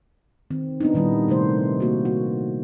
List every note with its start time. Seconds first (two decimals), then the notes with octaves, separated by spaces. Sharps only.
0.51 D#3 C4
0.81 B3 D4 D#4
0.94 A#2 D#3 G3 E4
1.28 C3 D#3 A3 C5
1.80 A#3 F#4
2.05 F#4